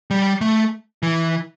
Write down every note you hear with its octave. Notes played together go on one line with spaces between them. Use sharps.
G3
A3
E3